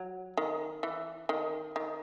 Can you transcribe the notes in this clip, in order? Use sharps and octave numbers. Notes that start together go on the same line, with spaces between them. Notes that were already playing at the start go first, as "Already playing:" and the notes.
Already playing: F#3
D#3
E3
D#3
D#3